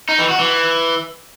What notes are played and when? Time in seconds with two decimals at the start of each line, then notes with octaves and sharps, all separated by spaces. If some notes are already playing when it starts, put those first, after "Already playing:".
0.09 D#4
0.19 E3
0.29 F#4
0.39 E3